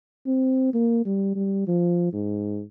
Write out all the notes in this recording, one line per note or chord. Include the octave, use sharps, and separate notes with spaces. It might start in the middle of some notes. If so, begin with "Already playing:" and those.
C4
A#3
G3
G3
F3
G#2